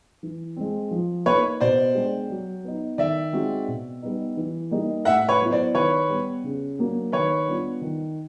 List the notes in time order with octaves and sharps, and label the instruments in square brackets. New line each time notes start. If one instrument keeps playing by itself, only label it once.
[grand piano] E3
G#3 C4
F3
[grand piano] A#3 D#4 [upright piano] B4 C#5
[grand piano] B2 [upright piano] C5 D5
[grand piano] G#3 B3 D4 G4
F#3
B3 D#4
[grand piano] D#3 [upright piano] D5 E5
[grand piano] G#3 C4 D#4 F#4
B2
G3 B3 D#4
E3
G3 A#3 D#4 G4
[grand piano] A2 [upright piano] E5 F#5
[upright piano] B4 C#5
[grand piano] F#3 B3 E4
[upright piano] C5 D5
[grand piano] D#3 [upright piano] B4 C#5
[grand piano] G3 B3
C#3
F#3 A#3 D4
[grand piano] D#3 [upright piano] B4 C#5
[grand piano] G3 B3 D4 F4
D#3